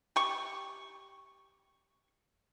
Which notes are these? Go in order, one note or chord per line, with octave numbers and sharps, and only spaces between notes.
G4 C#6